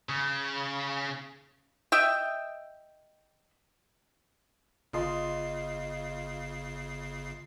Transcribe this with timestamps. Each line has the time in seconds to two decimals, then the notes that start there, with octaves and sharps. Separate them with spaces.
0.09 C#3
1.92 D#5 E5 G5
4.93 G1 C#3 F4 D#5 C6 C7